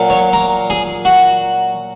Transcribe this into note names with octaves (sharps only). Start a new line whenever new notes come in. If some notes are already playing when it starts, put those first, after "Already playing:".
Already playing: A#2 F#3 A#3
C#5
A#4
G#4
F#4